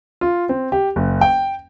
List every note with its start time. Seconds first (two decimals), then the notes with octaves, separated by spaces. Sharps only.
0.21 F4
0.49 C4
0.72 G4
0.96 F#1
1.21 G5